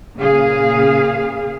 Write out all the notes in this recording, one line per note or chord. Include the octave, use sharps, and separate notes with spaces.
A#2 C#3 G#4 F5